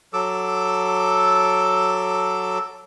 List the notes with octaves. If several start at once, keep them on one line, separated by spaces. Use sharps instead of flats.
F#3 A4 D6 E6